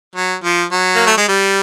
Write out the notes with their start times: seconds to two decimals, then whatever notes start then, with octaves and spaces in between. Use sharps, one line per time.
0.16 F#3
0.44 F3
0.72 F#3
0.95 A#3
1.07 A3
1.17 G#3
1.28 G3